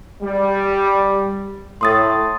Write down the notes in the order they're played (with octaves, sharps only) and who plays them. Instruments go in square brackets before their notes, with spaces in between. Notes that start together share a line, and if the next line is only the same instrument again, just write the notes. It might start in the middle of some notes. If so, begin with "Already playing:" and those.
[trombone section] G3
[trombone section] A2 [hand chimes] C6 D#6 A6